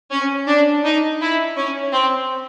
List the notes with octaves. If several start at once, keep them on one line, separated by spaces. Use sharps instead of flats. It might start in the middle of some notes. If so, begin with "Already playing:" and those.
C#4
D4
D#4
E4
C#4
C4